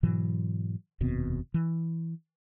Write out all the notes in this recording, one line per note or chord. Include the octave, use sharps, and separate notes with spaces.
G#2 B2 E3 F#3
F1 D#2 B2 C4
E3